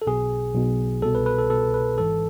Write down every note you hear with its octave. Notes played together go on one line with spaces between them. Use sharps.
A4
B1 B2 G#4
B1 B2
C2 B2 A4
B4
B4
A4
C2 B2 A4
B4
G#1 G#2 E3 A4